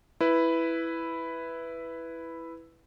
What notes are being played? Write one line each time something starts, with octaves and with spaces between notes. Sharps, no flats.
E4 B4